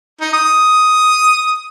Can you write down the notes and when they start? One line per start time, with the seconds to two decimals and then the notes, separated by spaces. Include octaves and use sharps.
0.21 D#4
0.33 D#6